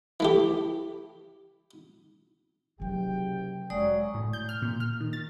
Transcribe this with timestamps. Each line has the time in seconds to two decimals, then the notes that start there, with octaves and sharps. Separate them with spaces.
0.20 E3 A3 G4
2.80 F#1 C3 F#3 G4 G5
3.70 F1 F#2 F#3 G#3 D5 D#6
4.15 A2
4.33 G6
4.49 F6
4.62 A#2
4.80 F6
5.00 D#3
5.13 A6